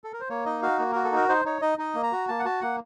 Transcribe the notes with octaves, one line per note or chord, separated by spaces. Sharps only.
A4
A#4
C5
A#3 C#5
D#4 D#5
F#4 F5
A#3
F#4 A#4
A4
D#4 A#4
D#4 C5
D#4 C#5
D#4 D#5
D#4 D#5
A#3
A#5
F#4
A#3 A5
F#5
F#4 A5
A#3 F#5